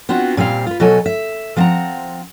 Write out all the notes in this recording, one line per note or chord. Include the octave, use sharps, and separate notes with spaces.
B3 C4 D4 F4 F#4
A#2 G3 C4 F5
F4 B4
B2 F#3 A4 C#5 G#5
E5
F3 B3 C4 D#5 F#5 A#5